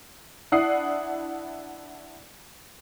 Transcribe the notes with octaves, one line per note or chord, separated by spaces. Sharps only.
D4 E4 F#5 D#6 C7